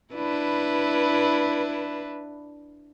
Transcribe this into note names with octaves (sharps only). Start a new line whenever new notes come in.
D4 E4 B4